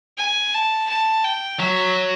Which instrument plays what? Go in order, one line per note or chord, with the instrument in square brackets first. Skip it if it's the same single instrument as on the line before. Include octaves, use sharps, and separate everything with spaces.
[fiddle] G#5
A5
A5
G5
[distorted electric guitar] F#3 [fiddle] E5